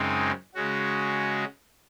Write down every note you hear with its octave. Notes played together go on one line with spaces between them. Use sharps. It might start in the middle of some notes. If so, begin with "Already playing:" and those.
Already playing: F#2 C#3 G#3 C4 D#4
C#3 G#3 C#4 F#4